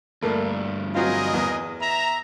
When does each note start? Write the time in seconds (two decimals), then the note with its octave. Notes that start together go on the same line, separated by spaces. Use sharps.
0.22 D2 G2 A3 A#3
0.95 F#3 C4 F4 G#4 A#4 D#5
1.33 E2
1.80 E5 A#5